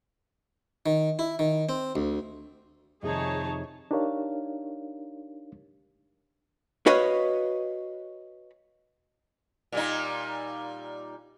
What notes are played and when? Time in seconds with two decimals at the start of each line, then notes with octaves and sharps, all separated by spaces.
0.86 D#3
1.19 E4
1.39 D#3
1.69 C4
1.96 D2
3.03 F2 C3 D#3 D#4 G#4 C#5 A5
3.91 D4 D#4 G4 A#4 C#5 F5
6.86 F#4 B4 C#5 D#5 F5
9.72 A#2 G3 D#4